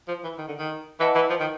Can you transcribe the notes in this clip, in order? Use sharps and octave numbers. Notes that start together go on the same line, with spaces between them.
F3
E3
D#3
D3
D#3
E3 B4 D#5 F#5 A5
E3
F3
D#3